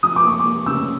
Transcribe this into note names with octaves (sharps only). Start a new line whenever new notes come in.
F3 D#6
D6
A#3 C#6
D6
A#3
C#3 E6